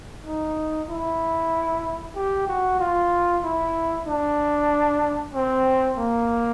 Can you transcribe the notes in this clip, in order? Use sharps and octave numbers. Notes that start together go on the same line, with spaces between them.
D#4
E4
G4
F#4
F4
E4
D4
C4
A#3